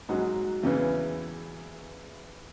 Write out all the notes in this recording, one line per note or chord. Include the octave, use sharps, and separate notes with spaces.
G#2 F#3 D#4 F#4
E2 C#3 E3